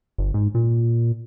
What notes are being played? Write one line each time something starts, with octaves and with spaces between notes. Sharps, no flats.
G1
G#2
A#2